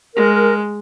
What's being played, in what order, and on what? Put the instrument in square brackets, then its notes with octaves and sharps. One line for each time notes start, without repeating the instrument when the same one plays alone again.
[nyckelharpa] G#3 [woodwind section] A#4